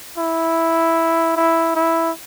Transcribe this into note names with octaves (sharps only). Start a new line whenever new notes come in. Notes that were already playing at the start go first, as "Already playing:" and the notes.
E4
E4
E4